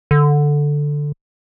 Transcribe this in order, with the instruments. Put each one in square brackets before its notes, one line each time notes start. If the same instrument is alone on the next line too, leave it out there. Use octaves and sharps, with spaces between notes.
[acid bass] D3